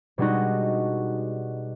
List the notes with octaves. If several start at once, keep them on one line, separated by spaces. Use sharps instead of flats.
B2 G3 G#3 D4 D#4 F#4